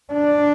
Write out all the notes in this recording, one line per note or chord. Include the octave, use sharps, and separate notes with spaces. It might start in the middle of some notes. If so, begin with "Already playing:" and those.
D4